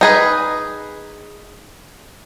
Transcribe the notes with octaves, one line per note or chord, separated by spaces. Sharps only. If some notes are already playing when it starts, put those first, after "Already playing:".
D#4 G#4 B4